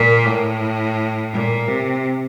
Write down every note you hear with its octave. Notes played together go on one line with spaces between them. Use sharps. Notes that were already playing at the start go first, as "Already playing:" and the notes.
Already playing: A#2
A2
A#2
C3